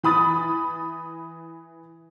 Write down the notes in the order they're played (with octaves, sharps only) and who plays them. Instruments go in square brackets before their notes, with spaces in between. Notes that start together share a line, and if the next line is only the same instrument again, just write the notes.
[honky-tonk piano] E3 B5 D#6 A6